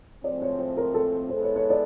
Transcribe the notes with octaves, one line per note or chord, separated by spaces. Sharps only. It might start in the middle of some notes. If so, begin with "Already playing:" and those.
A2 F3 G#3 C4 D5
C#5
C5
A#4
A4
G#3 B3 E4 A4 C5
C#5
C#5
D5